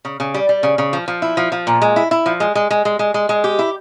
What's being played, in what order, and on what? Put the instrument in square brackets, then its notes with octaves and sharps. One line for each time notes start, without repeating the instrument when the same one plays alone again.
[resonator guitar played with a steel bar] C#3
C#3
G3
G3
C#3
C#3
F3
F3
E4
F3
F3
A#2
G#3
E4
E4
F3
G#3
G#3
G#3
G#3
G#3
G#3
G#3
G4
E4